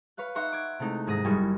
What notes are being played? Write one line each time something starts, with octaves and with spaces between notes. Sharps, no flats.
B4 C#5 F5 F#6
D#4 E5 F#5 C6 C#6
D6 G#6 D7
C3 G#3 A3 D#4 E4
D#1 G#2 G#4 D#6 A#6
F#1 G3 E4 G#5 C#6